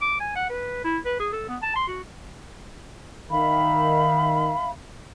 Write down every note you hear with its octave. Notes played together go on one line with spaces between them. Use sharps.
D6
G#5
F#5
B4
E4
B4
G#4
A4
B3
A5
C6
F#4
D#3 E5 F5 B5